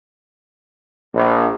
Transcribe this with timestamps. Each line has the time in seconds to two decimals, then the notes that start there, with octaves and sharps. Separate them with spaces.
1.15 A#1